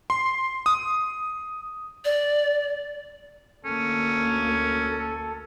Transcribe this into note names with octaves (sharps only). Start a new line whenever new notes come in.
C6
D#6
D5
D2 A#3 C#4 A4